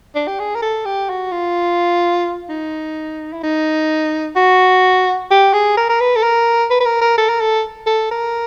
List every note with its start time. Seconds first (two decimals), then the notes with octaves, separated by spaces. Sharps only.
0.15 D4
0.28 G4
0.39 G#4
0.55 A#4
0.62 A4
0.85 G4
1.10 F#4
1.32 F4
2.49 D#4
3.33 E4
3.43 D#4
4.36 F#4
5.31 G4
5.53 G#4
5.77 A#4
5.89 A#4
6.01 B4
6.16 A4
6.23 A#4
6.70 B4
6.80 B4
6.85 A#4
7.01 A#4
7.18 A4
7.29 A#4
7.41 A4
7.87 A4
8.11 A#4